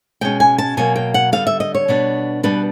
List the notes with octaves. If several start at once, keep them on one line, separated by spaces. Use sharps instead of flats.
B2 G#3 C#4 G5
G#5
A5
B2 F#3 A#3 G#5
G5
F#5
D3 G3 B3 F5
E5
D#5
C#5
B2 G3 B3 D4
B2 G3 B3 D4 B4